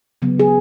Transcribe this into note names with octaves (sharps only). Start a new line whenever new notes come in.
C#3 F#3 B3
G#4